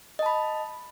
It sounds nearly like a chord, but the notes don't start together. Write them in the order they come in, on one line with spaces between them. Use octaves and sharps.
D#5 A5 B5